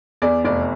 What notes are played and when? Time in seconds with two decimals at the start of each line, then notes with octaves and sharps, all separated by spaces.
0.22 E2 D5
0.44 F1 D5